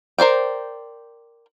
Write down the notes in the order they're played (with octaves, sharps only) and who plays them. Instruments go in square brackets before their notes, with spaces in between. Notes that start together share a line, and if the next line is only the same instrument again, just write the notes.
[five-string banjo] A#4 C5 D5 G5